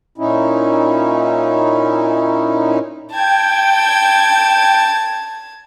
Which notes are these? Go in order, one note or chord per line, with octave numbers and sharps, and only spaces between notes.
A#2 C#4 D#4 E4
G5 A5 G#6